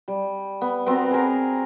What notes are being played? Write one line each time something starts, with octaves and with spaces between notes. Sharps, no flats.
G3
B3
B3 C4 F#4 A#4
G#4 A#4